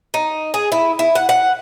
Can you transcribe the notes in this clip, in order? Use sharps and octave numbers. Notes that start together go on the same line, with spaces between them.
D#4
G#4
E4
E4
F#5
F#5